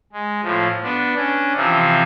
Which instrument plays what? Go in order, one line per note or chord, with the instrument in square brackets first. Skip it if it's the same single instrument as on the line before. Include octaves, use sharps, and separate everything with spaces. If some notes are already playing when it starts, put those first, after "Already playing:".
[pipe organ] G#3
A2 F3
B3 D4
C#4 D4
C3 E3 F3 C4